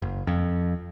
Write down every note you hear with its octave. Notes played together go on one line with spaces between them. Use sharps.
F#1
F2